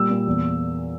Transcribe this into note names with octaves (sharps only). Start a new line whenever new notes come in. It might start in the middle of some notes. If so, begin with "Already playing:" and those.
Already playing: A#2 G3 E6
A#2
E2